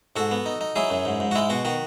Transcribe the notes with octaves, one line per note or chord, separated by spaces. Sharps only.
G#2 F#4 A4
B3
D#4
D#4
F#3 E4 G#4
F#2
G#2
G#2
F#4
G#3 E4
B2 F#4
D#3 F#4